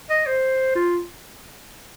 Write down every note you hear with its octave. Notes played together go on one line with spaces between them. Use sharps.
D#5
C5
F4